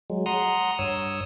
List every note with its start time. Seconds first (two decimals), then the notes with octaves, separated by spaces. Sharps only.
0.10 F#3 G#3
0.26 F#5 A#5 C6 D#6
0.79 G2 C#5 D#6 E6